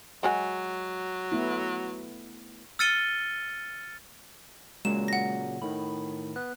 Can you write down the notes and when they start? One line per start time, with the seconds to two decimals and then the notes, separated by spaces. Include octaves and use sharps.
0.23 F#3 G#3 F#4 G#5
1.32 A3 B3 E4
2.79 E6 F6 A6 C#7 D#7 G7
4.85 A#2 C#3 F#3 G#3 E7
5.08 F#5 A#6
5.62 A2 D#3 B5
6.36 B3 F#6